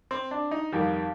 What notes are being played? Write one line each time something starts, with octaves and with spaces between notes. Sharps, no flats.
C4
D4
D#4
F2 D#3 G3